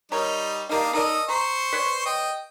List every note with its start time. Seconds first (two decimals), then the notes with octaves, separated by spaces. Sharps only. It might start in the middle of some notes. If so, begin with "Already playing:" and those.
0.12 G3 D#4 A#4 C#5
0.69 G3 A#3 D4 D#4 D#5 F5
0.93 D#4 A4 A#4 D5 D#5
1.28 C5 A#5 C#6
1.73 B4 C#5 D5
2.06 D#5 G5